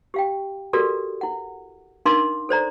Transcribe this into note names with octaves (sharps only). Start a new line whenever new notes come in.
G4 F5 G5
F#4 G4 A4 A#4 D5
E4 F#5
D4 D#4 A#4 F5 C6 D6
A4 C5 D5 A#5